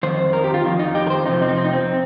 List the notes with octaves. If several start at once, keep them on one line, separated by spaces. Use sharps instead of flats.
F2 D#3 C5
A#4
G4
F4
F2 D#3
D#4
G4
A#4
C5
F2 C3 F3 D#4
C4
D#4
C4
D#4
C4